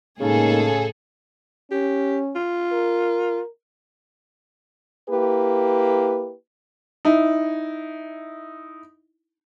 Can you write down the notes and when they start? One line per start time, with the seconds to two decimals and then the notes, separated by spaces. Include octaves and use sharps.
0.20 A2 C#3 G#3 A#3 D#4 G#4 A4
1.72 C#4 G4
2.35 F4
2.72 A#4
5.09 A#3 E4 G4 B4
7.05 D#4 E4